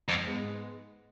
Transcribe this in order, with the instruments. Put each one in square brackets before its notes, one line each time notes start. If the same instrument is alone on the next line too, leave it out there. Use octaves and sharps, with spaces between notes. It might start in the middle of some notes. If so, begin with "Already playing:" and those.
[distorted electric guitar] F2
[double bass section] G#2 G#3 B3